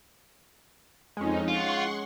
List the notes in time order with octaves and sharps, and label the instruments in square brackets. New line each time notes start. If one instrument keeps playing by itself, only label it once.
[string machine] F2 D#4 [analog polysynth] G#3 C#4
[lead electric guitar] F4 [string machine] F#5 C6 C#6